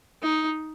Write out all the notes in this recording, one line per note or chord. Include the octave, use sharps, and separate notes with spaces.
D#4